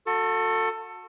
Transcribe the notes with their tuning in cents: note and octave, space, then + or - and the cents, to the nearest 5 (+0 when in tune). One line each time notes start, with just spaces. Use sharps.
F#4 -30 A4 +20